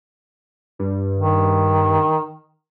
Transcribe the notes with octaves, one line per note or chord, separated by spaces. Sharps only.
G2
D#3